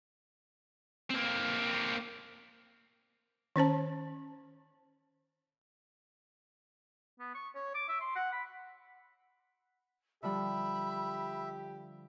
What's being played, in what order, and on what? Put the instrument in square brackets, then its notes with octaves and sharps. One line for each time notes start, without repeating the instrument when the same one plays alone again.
[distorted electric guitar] A#3 C4
[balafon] D#3 C#4 C5 A5
[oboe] B3
C#6
C#5
D6
E5
C6
F#5
B5
[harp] D3 F3 G3 [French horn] G4 [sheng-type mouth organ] E5 [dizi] B5